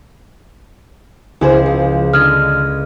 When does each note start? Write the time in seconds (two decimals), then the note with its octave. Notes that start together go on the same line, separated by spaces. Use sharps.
1.41 C#2 E4 G#4 C5
1.66 F3
2.13 D3 D#5 F6 G#6